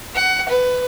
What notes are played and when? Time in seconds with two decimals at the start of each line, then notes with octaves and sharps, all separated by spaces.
0.15 F#5
0.49 B4